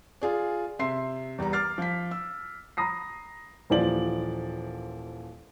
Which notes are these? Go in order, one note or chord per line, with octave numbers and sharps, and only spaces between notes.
F4 G#4 D5
C3 E5 C6 C7
E2 G3 B3 A#5
D6 F6 A6 C7
F3 B6
E6
A#5 B5 D#6 A#6 C7
D#1 A#2 E3 F3 D5 F#7